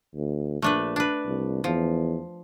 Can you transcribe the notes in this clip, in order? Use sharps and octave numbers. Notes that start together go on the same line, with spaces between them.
D2
A#1 A3 D4 B4
D4 B4
C2
E2 F3